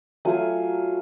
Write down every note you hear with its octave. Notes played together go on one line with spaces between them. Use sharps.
F#3 A3 F4 G#5